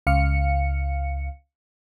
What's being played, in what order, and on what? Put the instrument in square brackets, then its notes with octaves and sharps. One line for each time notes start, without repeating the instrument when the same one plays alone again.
[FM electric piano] C#2 F5 C#7